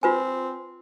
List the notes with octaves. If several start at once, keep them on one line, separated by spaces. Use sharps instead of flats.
C4 F4 B4 G#5